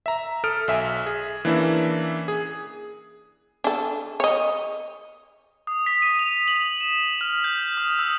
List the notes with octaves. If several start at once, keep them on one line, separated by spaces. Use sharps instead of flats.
E5 A#5
A4 D#6 F6 D7
B1 E5 G#5
G#4
E3 A#3 C#4 D4 E4 E5
G#4
D4 A4
C#5 D#5
D#6
B6
D#7
F7
F#7
E7
F6
G6
D#6
E6